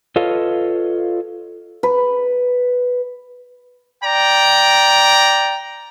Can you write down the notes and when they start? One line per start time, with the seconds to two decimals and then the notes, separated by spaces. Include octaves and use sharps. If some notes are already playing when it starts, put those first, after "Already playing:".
0.16 F4 A4 B4 C#5 D#5 F5
1.83 B4
4.04 D5 G5 A#5